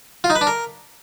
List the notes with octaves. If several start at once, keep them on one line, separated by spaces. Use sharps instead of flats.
F4
D#4
B4
D4
A#4